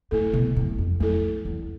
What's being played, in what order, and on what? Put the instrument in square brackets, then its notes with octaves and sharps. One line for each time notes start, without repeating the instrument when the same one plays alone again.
[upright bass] A2 [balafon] A3 E4 A4
[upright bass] B2
A2
F2
[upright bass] F2 [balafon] A3 E4 A4
[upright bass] E2